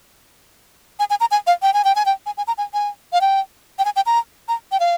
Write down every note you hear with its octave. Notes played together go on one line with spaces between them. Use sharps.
G#5
G#5
A#5
G#5
F5
G5
G#5
G5
G#5
G5
G#5
G#5
A#5
G#5
G#5
F5
G5
G5
G#5
G5
A#5
A#5
G5
F5